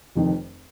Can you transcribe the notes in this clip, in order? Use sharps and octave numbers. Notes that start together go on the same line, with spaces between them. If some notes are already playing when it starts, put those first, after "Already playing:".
F1 F2 D#3